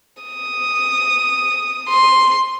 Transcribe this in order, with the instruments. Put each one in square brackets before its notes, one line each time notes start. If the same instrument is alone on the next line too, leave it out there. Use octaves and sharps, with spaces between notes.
[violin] D#6
C6